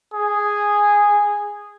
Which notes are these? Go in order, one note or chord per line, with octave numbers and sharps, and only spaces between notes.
G#4